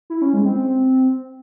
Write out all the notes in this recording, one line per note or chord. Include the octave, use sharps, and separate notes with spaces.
E4
C#4
G#3
C4